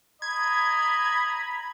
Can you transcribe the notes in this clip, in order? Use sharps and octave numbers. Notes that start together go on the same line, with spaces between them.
D#5 A#5 B5 G#6